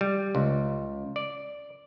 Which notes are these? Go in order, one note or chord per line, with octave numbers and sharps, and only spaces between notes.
G3
C#2
D5